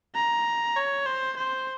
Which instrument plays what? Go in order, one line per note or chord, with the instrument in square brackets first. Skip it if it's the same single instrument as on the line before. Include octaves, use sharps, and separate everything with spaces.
[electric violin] A#5
C#5
C5
C5